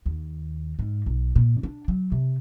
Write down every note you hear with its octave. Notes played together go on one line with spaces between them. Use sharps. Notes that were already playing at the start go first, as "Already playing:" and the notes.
D#2
G#2
B1
A#2
D4
F#3
C3